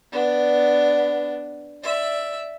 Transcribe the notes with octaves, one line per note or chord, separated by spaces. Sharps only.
B3 D4
D5 E5